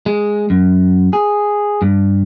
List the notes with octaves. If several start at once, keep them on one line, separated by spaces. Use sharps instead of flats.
G#3
F#2
G#4
G2